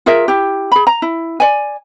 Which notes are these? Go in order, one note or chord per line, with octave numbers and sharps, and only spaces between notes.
F4 G#4 A#4 E5
E4 G4
G#4 B5
A#5
E4
D5 G#5